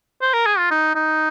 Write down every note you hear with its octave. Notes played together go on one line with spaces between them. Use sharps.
C5
A#4
G#4
F4
D#4
D#4